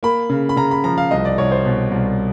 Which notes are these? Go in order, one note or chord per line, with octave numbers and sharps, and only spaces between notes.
A#3 B5
C#3
B5
C#3 A#5
B5
F3 A#5
F5
C2 D#5
D5
C2 C#5
C5
B2
C2